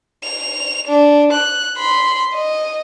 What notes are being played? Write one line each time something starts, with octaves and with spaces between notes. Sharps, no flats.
F7
D4
F#6
B5 C6
D#5